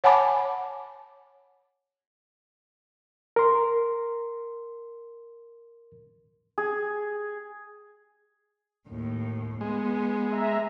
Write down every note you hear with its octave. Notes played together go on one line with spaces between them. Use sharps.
C#5 F#5 G#5 A5 B5 D6
A#4 C6
G#4
D#2 A2
G#3 B3
E5 A#5